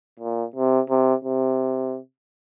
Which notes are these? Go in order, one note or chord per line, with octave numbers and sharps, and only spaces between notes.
A#2
C3
C3
C3